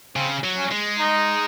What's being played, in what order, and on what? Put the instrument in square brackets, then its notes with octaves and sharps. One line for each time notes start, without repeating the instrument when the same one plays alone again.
[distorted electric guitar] C#3 [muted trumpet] C4
[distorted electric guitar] F#3
[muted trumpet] C#4
[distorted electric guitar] G#3
[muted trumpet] D#4